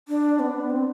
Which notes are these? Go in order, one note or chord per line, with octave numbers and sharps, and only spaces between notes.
D4
B3
C4